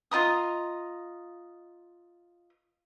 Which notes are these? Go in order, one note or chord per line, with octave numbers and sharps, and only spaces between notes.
F4 D#5 A#5 D#6